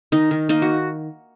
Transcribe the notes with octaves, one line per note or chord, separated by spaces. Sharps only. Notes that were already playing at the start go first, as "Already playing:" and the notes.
D#3 D#4
D#3
A#3 D#4
F#4